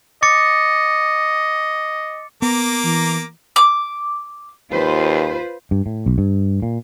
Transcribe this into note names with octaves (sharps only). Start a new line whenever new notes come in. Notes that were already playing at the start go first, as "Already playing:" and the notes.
D#5 D6 A6 C#7
A#3 B3 A#5 D6 A#6
E3
D6
D#2 F4 B4 C5
G2
A2
B1
G2
A#2